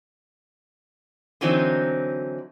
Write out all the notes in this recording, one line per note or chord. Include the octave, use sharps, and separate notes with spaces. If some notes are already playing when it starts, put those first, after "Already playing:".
D3 E3 F#3 C4 D#4